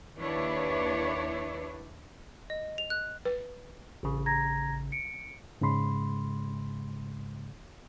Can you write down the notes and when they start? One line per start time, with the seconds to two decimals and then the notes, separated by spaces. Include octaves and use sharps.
0.17 D#2 D4 E4 B4 C#5 D5
2.50 D#5
2.78 F7
2.90 F#6
3.25 B4
4.03 A1 C#3
4.26 A#5 G#6 A#6
4.92 C#7 D7
5.61 G#2 C#3 G#3 B5 C6